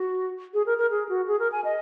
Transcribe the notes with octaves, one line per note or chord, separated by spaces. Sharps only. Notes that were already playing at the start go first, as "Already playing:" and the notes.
Already playing: F#4
G#4
A#4
A#4
G#4
F#4
G#4
A#4
G#5
D#5